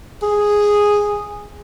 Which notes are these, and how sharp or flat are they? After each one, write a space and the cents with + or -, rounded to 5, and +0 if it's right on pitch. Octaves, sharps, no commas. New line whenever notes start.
G#4 -5